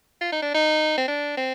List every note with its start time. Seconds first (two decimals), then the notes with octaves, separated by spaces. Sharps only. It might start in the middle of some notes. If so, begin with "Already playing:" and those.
0.21 F4
0.32 D#4
0.42 D4
0.54 D#4
0.98 C4
1.08 D4
1.37 C4